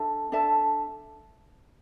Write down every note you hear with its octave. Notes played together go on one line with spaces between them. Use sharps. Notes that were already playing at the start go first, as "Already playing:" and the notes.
Already playing: D4 A4 E5 A5
D4 A4 E5 A5